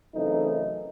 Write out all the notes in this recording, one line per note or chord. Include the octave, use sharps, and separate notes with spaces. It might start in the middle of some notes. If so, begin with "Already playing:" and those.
F#2 C#3 E3 A3 C4 D#4